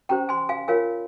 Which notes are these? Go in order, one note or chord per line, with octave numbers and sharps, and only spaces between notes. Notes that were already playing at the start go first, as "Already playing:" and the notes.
C#4 G4 C5 G5 A#5
G#5 C6
F5 G#5
F4 A#4 C#5 F5 G#5